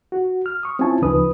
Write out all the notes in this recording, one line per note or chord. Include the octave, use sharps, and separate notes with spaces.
F#4
F6
C#6 D#6
C4 C#4 E4 F4 G#5 A5
D2 C#3 F3 D#4 B4 D#6